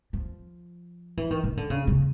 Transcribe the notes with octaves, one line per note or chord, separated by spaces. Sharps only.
F3
E3
D#3
D#3
D3
C#3
C#3